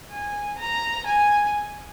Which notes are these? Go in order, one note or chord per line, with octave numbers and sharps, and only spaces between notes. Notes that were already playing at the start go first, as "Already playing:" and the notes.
G#5
A#5
G#5